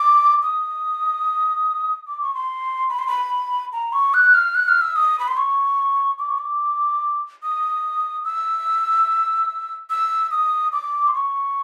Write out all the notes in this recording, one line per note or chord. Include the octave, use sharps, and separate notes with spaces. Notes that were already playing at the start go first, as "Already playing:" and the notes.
Already playing: D6
D#6
D6
C#6
C6
B5
C6
B5
A#5
C#6
F#6
F6
F#6
F6
E6
D#6
B5
C6
C#6
D6
C#6
D6
D#6
E6
E6
D#6
D6
C6
C#6